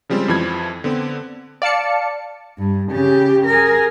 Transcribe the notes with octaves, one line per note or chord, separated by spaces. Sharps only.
C#3 F3 G3 G#3 C4
F2 E3 F3 B5 G#6
D3 B3 C4
D5 F5 A5 C#7
G2
C#3 G4
G#4 A#4